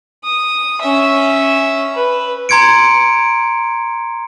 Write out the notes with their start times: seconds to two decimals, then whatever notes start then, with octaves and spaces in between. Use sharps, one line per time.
0.24 D#6
0.82 C#4 E5
1.95 B4
2.49 A#5 C6 G#6 C#7 D7